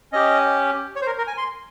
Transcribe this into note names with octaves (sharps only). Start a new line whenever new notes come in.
C#4 G4 D#5
C#5
C5
A#4
A#4
G#5
C6